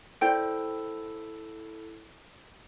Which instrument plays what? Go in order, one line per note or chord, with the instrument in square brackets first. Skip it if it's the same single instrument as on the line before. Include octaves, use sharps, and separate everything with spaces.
[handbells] E4 A4 [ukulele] C5 D5 G5